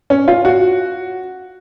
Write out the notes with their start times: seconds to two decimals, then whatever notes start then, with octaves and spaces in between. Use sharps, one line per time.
0.10 C#4
0.28 F4
0.45 F#4